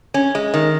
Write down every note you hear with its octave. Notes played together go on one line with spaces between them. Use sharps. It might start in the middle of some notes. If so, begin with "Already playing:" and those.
C#4
G#3
D#3